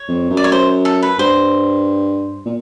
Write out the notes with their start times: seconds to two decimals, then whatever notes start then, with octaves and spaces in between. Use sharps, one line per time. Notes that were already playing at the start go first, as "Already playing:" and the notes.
Already playing: C#5
0.08 F2
0.30 F#2
0.37 D5
0.44 C#5
0.52 C5
0.85 A4
1.03 B4
1.19 G2 C5
2.46 A#2